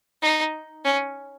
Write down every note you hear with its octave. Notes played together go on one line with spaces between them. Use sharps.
D#4
C#4